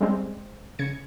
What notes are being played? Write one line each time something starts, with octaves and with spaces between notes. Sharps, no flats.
G3 G#3 C4
C#3 G#6 C#7